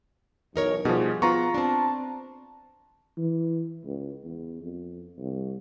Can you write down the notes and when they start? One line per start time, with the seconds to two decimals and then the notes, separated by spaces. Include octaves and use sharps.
0.56 B1 E3 D#4 A#4 C#5
0.85 B2 F3 G3 D#4 G#4
1.22 B3 F4 A#5 C#6
1.54 C4 D4 A5
3.18 E3
3.85 C#2
4.24 E2
4.62 F2
5.18 C2